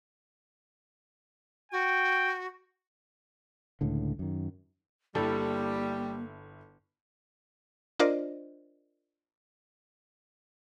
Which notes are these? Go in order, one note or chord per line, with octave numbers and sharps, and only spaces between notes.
F#4 G5
C#2 A2 D3
F#2 D#3
G1 G3 A#3 E4 A4
D4 F4 A#4 C5 D5 D#5